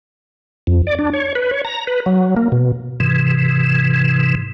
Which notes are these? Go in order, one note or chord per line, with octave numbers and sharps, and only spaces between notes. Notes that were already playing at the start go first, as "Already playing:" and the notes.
F2
D5
D4
C#5
B4
C#5
A#5
B4
F#3
A#3
B2
G#2 C3 E3